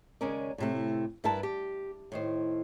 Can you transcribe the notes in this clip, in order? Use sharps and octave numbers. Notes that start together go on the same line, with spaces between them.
D#2 C#3 G#3 C#4 A#4 D5
A2 C3 A3
G2 E4 A#4 B4 A5
G4
A2 D#3 C5